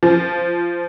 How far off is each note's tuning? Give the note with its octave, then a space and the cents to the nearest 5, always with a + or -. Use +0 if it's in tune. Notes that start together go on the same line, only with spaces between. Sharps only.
F3 -15